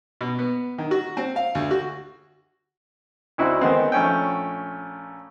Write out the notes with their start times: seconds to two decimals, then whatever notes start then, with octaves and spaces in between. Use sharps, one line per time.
0.21 B2
0.39 B3
0.78 D#3
0.91 F#4
1.17 C4
1.36 F5
1.55 D2
1.71 F#4
3.38 D2 C4 D#4 E4 F#4 F#5
3.61 D#3 G#3 B3 C4
3.92 A#1 A3 C#4 G5